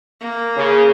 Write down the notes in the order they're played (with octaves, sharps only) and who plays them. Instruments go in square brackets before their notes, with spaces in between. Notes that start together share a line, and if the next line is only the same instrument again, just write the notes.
[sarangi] A#3
[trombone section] C#3